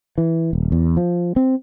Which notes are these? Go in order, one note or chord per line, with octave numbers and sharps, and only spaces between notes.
E3
D#1
E2
F3
C4